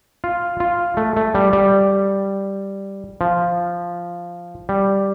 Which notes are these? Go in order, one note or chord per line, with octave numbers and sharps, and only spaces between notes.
F4
F4
A3
A3
G3
G3
F3
G3